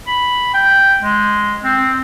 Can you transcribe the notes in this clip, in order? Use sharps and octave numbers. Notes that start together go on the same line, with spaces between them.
B5
G5
G#3
C4